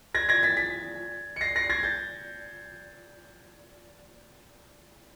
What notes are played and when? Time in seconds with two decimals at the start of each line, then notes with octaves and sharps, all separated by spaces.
0.15 G#6 A#6
0.29 G#6 A#6
0.43 A6 B6
0.57 A6 B6
1.36 C#7
1.41 A#6 C7
1.56 A#6 C7
1.70 G#6 A#6
1.83 G6 A6